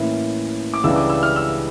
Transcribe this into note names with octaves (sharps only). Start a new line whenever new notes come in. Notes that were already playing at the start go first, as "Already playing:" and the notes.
Already playing: A2 E3 A#3 C#4 E4
D6
C#2 C#3 E3 G3 D4 E6
D6
E6
F6
E6